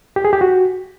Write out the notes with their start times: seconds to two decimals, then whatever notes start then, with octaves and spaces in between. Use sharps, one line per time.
0.16 G4
0.25 G#4
0.33 G4
0.41 F#4